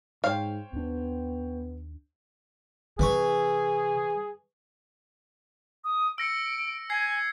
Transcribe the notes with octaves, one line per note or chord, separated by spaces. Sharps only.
G#2 C5 C#5 F5 G5
D#2 B3 D4
C3 E3 G#4 B5 C#6
D#6
E6 A#6 C#7 D7
G#5 G#6 C7